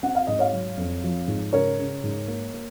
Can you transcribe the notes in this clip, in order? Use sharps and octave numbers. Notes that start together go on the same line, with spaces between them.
C4 F#5
F5
G#2 D#5
C#5 F5
F#3
F2
F3
G#2
C#3 A#4 C#5
C#3
G#2
A#3
A#3